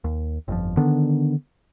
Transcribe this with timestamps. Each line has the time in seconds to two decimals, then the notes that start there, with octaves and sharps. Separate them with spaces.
0.04 D#2
0.48 G1 F2 F3
0.77 D3 D#3 B3 D4